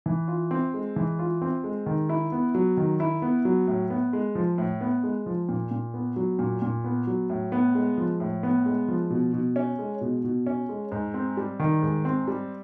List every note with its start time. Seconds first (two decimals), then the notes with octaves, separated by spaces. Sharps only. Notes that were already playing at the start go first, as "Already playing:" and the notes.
0.06 E3
0.28 F4
0.51 C4
0.74 G#3
0.96 E3
1.19 F4
1.42 C4
1.64 G#3
1.86 D#3
2.09 E4
2.32 B3
2.55 F#3
2.77 D#3
3.00 E4
3.22 B3
3.45 F#3
3.67 A2
3.90 B3
4.13 G#3
4.35 F3
4.58 A2
4.81 B3
5.03 G#3
5.26 F3
5.49 A#2
5.71 A#2
5.94 B3
6.16 F#3
6.39 A#2
6.62 A#2
6.84 B3
7.07 F#3
7.30 A2
7.52 B3
7.75 G#3
7.97 F3
8.20 A2
8.43 B3
8.66 G#3
8.88 F3
9.10 B2
9.33 B2
9.56 C#4
9.79 G#3
10.01 B2
10.24 B2
10.47 C#4
10.69 G#3
10.92 G#2
11.14 C4
11.37 G3
11.60 D#3
11.82 G#2
12.05 C4
12.28 G3